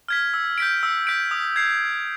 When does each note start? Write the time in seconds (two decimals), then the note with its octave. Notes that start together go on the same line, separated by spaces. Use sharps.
0.08 F6 G#6 B6
0.34 E6
0.58 G6 B6 D7
0.83 E6
1.07 G6 B6 D7
1.31 D#6
1.56 G#6 C7